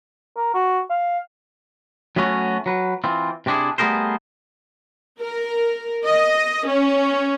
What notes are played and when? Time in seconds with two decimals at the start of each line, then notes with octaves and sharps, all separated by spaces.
0.37 A#4
0.54 F#4
0.90 F5
2.16 F#3 A3 B3 C#4 F#4
2.66 F#3 B4
3.04 E3 C4 F4
3.46 C3 C4 D4 E4 G#4
3.78 G3 A3 B3 G#4 A#4 C5
5.20 A#4
6.05 D#5
6.67 C#4